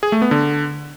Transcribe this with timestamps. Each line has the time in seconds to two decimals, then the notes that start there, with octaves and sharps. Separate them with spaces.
0.03 G#4
0.12 A3
0.22 B3
0.31 D3